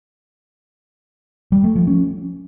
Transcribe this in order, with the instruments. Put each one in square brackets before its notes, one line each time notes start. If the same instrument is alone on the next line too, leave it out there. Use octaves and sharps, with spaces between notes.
[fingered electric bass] G3
A3
F3
C#4